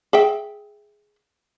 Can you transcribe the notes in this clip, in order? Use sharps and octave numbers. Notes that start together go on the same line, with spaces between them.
G#4 E5 G5